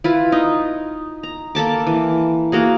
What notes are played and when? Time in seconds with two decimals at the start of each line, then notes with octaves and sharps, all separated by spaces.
0.04 E4 F4 B4
0.32 D#4
1.23 A#5
1.55 A#3 A4 A5 D6
1.87 E3
2.52 A#3 F#4 G#4